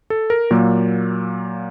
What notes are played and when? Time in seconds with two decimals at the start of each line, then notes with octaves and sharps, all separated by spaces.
0.10 A4
0.30 A#4
0.51 A#2 F#3 A#3